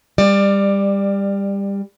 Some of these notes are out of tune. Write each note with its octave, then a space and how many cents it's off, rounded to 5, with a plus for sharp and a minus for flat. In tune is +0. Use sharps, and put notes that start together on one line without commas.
G3 +25 D5 +15